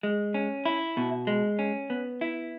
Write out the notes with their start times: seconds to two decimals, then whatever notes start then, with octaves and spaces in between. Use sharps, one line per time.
0.03 G#3
0.34 C#4
0.65 E4
0.97 B2
1.27 G#3
1.59 C#4
1.90 B3
2.21 E4